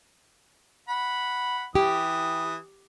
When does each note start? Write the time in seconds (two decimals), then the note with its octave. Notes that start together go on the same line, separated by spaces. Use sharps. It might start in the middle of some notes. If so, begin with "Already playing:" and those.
0.89 F#5 B5
1.75 E3 G4 D#6